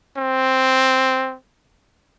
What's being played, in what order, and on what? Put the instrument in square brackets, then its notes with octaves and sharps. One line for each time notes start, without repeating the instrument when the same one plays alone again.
[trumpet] C4